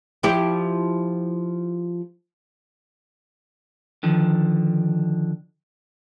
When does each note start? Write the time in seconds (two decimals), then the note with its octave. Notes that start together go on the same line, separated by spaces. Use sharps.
0.23 F3 E4 G4
4.03 D3 D#3 F3